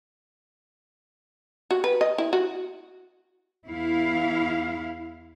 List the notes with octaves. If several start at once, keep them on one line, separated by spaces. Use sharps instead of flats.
F#4
B4
D#5
E4
F#4
E2 E4 F5